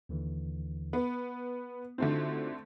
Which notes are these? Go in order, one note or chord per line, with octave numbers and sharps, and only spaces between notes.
D#2 D3 E3
B3 B5
D3 A3 C4 D#4 F4 F#4